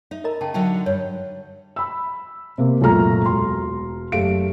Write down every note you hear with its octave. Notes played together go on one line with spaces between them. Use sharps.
D#4 E5
A#4 D#5 A#5
C#3 G5 A5
D3 F#3 D#4 E5 G5 A5
G2 C#5
B5 E6
C3 A#3
C#2 F#2 A#2 A3 A#5 F6
E1 C6
F#1 A3 G4 F5 D7